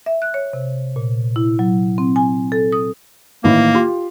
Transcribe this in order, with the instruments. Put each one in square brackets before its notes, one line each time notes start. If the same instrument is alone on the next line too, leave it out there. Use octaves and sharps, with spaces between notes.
[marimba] E5
F#6
C#5
C3
A#2
E4
F#3
C4
G#5
A4
D#6
[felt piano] A1 D#3 E4 [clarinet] A#3
[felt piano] F4 G4 C6